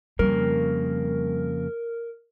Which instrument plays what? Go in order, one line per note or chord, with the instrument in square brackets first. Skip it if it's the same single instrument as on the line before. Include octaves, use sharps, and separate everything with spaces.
[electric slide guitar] F2 C#3 A#3 [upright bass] G3 [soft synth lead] A#4